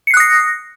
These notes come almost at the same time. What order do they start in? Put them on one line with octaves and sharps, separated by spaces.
C#7 C7 F#6 D#6 A#6